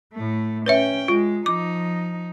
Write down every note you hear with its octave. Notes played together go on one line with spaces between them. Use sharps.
A2 A3
C#4 B4 C#5 E5 G5
G#3 F4
F3 D#4 D6